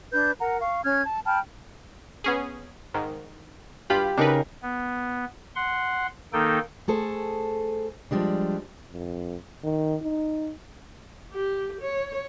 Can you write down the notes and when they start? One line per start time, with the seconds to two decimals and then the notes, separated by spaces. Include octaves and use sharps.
0.13 D4 B4 G6
0.41 A#4 F#5 A#5
0.61 F5 C#6
0.84 C#4 F6 G#6
1.03 A5
1.26 G5 A5 B5 F6
2.24 B3 C#4 G#4
2.94 G#2 D#3
3.90 G2 F4 G4 B5
4.17 C#3 D4 D#4 A#4 B4
4.63 B3
5.55 F#5 C6
6.33 D#3 A#3 D#4 A4 G5
6.88 A3 G#4 A4 C5
8.11 F3 G3 G#3 D4
8.92 F2
9.63 D#3
10.01 D#4
11.32 G4
11.81 C#5